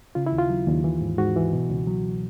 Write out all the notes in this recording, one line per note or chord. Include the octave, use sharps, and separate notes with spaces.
C#3 F4
E4
D#2
F4
F#3
D#2
E3
G#2
G#2 F#4
E3
B2
C#2
F#3